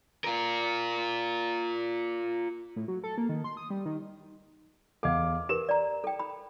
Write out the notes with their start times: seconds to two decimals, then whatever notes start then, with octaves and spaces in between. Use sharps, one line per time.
0.24 F4 A#4
2.76 A2
2.88 F#3
3.04 A4
3.18 A#3
3.29 D#3
3.44 C6
3.57 D#6
3.70 G3
3.85 D#3
5.03 E2 A4 D#5 F5 F#5 D6
5.49 G4 A#4 B4 E7
5.69 D5 A#5
6.04 A4 G5
6.19 B5